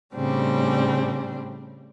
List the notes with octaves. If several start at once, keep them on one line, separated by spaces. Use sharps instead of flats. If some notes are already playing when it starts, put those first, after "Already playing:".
A2 C#3 G3 C4 D4